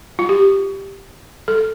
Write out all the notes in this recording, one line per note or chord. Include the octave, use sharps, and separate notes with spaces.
F4
G4
A4